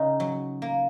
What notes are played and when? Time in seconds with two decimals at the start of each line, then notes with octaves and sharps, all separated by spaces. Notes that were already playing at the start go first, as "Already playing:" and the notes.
Already playing: C#3 D#4
0.20 F#3
0.62 A#3